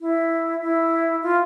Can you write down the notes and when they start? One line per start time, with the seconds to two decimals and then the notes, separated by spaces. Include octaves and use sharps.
0.01 E4
0.61 E4
1.23 F4